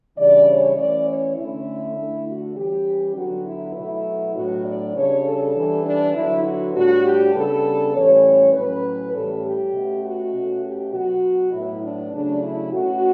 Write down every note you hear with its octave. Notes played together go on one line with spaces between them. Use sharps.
C#3 E3 G3 D4 D5
C#5
E3 A3 C#4 D5
C#5
D3 A3 C#4 E4
D3 A3 D4
F#4
E3 G3 C#4 G4
D3 F#3 B3 F#4
E4
B2 F#3 A3 E4
A2 F#3 B3 D4 F#4
D5
C#3 G3 D4 C#5
A4
E3 G3 B3 D4
D4
D3 F#3 B3 E4
F#4
A2 G3 D4 F#4
G4
C#3 G3 B3 D4 A4
A2 E3 G3 C#4 C#5
A2 F#3 C#4 B4
A2 E3 G3 C#4 A4
G4
B2 A3 C#4
F#4
B2 A3 C#4
G4
B2 F#3 B3 F#4
A2 F#3 B3 E4
D4
C#3 F#3 A3 D4
E4
B2 A3 C#4 F#4